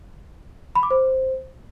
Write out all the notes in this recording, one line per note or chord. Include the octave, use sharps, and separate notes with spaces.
B5
D6
C5